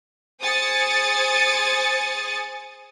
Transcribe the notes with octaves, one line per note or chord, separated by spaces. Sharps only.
G#4 C5 G#5 D#6 A6 C#7